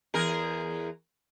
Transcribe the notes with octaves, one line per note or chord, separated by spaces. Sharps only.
E2 G#4 A#4